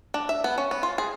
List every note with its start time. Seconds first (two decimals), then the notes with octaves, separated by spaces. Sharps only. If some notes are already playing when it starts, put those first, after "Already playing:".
0.14 D4
0.29 E5
0.44 B3
0.58 C#4
0.71 B3
0.83 F4
0.98 G#4